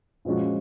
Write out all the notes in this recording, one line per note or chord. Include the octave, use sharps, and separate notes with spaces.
A#2 F3 G#3 C#4 F#4